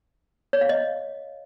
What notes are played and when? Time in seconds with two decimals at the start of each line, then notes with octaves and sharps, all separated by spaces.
0.53 C#5
0.61 F5
0.69 D#5